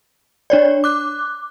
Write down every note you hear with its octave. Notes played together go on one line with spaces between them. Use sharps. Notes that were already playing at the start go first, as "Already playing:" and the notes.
D4 C#5 D5
D6 F#6